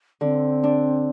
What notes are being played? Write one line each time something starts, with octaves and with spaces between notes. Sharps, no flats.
D3 C4
D4